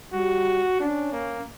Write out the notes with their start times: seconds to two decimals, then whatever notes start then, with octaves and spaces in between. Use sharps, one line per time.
0.13 G3 F#4
0.80 C#4 D4
1.13 A#3